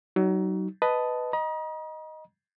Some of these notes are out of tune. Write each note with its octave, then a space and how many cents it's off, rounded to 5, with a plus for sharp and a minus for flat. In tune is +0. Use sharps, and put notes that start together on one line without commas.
F#3 +30 D#4 +0
B4 +10 D#5 +0 A5 +0
D#5 +0 A#5 +40